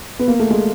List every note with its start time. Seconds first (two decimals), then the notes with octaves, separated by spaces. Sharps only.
0.19 B3
0.28 A#3
0.39 A3
0.50 G#3